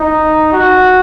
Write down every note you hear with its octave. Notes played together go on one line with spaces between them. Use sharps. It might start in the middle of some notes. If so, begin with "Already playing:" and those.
Already playing: D#4
F#4